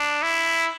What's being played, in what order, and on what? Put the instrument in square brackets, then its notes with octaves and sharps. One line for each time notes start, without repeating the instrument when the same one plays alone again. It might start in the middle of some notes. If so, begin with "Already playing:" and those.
Already playing: [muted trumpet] D4
E4